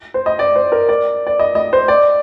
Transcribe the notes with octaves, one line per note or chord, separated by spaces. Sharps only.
C5
D#5
D5
C5
A#4
D5
D5
D#5
D#5
C5
D5